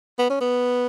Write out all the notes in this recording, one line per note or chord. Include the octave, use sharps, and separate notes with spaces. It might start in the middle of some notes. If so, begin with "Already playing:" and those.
B3
C#4
B3